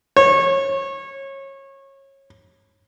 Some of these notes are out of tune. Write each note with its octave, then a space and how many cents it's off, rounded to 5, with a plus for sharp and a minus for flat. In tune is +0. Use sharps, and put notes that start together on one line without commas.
C#5 -25